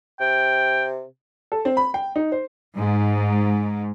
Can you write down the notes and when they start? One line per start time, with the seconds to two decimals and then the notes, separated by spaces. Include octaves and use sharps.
0.20 C3 G5
1.52 A4
1.65 C4
1.77 B5
1.94 G5
2.16 D#4
2.32 C5
2.76 G#2